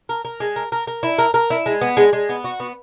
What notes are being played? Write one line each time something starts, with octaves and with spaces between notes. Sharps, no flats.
A#4
A#4
G#3
A#4
A#4
A#4
E4
A#4
A#4
E4
G#3
B3
G#3
G#3
B3
F#4
B3